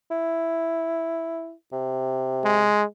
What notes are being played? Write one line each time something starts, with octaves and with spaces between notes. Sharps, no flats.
E4
C3
G#3